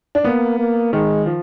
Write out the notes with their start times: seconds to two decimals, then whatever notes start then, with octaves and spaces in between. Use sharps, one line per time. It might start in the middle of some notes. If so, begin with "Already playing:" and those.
0.15 D4
0.24 A#3 B3
0.59 A#3
0.93 D#3 G#3
1.26 F3